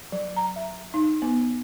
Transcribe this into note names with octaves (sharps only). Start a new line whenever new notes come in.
F#3
A#5
E5
D#4
B3